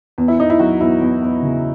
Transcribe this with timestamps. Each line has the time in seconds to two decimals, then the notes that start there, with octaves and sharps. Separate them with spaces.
0.18 E2
0.28 E4
0.39 E2 D#4
0.50 E4
0.59 F#3 F#4
0.80 E2 E4
1.01 E2
1.22 E2
1.42 C#3